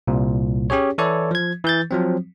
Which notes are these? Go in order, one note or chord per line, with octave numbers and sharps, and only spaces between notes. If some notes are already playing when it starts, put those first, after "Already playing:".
C2 A#2
C#4 G4 G#4 C#5
E3 E4 A4 C#5 D5
F3 G#6
E3 G6 A6
F3 F#3 C4